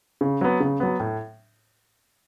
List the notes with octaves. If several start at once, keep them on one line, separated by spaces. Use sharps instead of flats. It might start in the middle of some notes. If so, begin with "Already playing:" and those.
C#3
F#3 B3
C#3
F#3 B3
A2